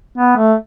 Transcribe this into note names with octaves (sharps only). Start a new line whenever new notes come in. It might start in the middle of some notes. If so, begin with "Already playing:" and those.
B3
A3